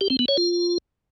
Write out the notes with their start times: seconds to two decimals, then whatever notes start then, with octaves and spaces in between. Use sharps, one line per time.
0.01 G4
0.10 C4
0.19 B3
0.28 C#5
0.37 F4